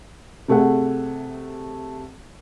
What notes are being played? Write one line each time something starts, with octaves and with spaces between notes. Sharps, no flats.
C3 A3 G#4 F#5